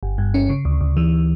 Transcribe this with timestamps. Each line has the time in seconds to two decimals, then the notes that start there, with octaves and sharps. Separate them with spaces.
0.03 G1
0.18 G2
0.34 C#4
0.50 C#3
0.65 D2
0.81 D2
0.97 E3